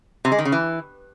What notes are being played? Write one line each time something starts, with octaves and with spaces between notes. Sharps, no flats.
C3
G#3
D#3
C#3
E3